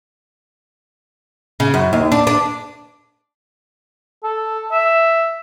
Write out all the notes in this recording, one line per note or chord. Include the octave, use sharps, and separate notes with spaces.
C#3
F#2
D#2
D4
D4
A4
E5